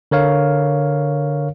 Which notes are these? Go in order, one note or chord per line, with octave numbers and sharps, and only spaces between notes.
D3 A#4 C#5 F5